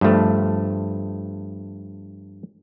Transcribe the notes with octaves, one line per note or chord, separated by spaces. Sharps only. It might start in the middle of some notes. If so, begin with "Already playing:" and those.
G2 F3 A3